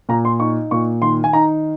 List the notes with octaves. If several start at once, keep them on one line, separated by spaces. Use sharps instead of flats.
A#2 A#5
C6
D#4 C#6
A#2 C#6
D#3 C6
G#5
D#4 A#5